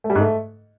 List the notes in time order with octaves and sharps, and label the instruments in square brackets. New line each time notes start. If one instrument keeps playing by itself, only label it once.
[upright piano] A3
G3
G#2
A3